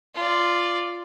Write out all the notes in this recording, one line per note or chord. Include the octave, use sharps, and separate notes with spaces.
F4 D5